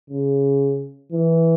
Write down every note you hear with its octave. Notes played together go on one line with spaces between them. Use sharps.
C#3
E3